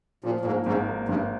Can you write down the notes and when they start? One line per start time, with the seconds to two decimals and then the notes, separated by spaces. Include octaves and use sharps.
0.23 A#2 F3
0.41 A#2
0.45 G#2 A#3
0.66 G#1 G#2
0.88 A#3
1.08 G#1 G2